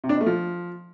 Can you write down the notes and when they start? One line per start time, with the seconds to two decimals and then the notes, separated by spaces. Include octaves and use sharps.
0.04 C3
0.09 D4
0.15 B2
0.21 A3
0.26 F3